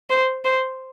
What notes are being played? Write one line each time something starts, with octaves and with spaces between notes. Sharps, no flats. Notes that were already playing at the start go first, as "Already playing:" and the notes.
C5
C5